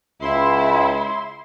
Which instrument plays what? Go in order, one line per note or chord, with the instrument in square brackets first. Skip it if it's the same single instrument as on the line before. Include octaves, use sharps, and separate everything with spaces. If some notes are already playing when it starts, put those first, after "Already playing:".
[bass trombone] C#2 [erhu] E4 [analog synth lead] C6